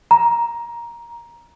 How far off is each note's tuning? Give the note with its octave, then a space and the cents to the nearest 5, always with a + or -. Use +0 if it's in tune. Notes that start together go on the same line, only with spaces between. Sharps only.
A#5 +15